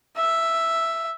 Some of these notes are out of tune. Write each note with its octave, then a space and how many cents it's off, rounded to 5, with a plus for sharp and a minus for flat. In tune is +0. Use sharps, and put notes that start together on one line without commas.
E5 +0